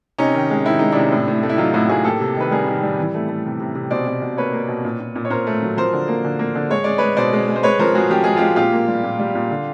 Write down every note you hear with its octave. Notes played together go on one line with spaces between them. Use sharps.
C3 C#4 D#4
D#3
G#3
D#3 E4
G#3 D#4
C3 D4 E4
A2
A2
A3
E4
F#3 D#4 F4
A2 E4 F#4
A2 F#4 G#4
A#3 G4 A4
C3
D#3 B4
G3 G#4 A#4
D#3
G3
E3
A3
A3
C3
C3
C3
B2 C5 D5
B2
B2
A#3 B4 C#5
A#3
B2
A#2
A#2
A#2
C#5
A#2 A#4 C5
A3
F#3
F3 A#4 C5
D3
A#3
D3
A#3
D3
G#3 C#5
G#3 D5
G#3 B4 C#5
B2 C5 D5
G#3
G#3
C5
G#3 B4 C#5
F3 A#4 C5
G#3 F#4 G#4
F3 G4
G#3 G#4
G#3 F4 G4
A#2 F4 G4
A#3
G3
A#2
G3
A#2
D3